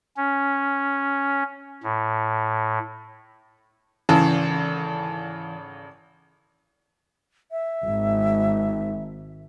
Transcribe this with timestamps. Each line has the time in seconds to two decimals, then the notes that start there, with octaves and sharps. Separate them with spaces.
0.17 C#4
1.83 A2
4.09 G#1 C#3 E3 A4
7.52 E5
7.83 G#1